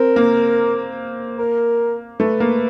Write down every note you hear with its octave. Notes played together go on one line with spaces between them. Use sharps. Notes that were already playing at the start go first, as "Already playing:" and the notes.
Already playing: C4 A#4
A#3
A#4
A3 B4
A#3